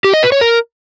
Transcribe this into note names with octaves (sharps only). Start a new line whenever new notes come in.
G4
D#5
B4
C#5
A#4